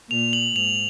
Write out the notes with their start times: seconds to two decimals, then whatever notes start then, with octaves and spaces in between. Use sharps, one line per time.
0.10 A#2 F7
0.33 F#7
0.56 G#2 F7